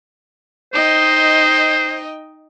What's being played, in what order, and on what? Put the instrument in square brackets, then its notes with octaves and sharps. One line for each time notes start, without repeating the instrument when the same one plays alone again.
[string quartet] D#4 D#5 G5 [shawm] C5